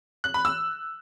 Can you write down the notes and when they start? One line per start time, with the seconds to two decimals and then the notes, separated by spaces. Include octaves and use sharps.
0.24 F#6
0.34 B5
0.45 E6